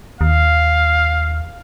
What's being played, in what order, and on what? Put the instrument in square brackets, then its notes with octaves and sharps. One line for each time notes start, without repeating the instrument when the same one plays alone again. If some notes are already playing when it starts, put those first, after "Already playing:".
[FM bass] D#2 [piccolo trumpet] F5